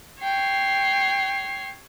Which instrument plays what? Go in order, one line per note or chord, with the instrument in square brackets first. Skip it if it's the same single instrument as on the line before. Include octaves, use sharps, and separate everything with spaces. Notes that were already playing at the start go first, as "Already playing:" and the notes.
[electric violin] C#5 C7 [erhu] G5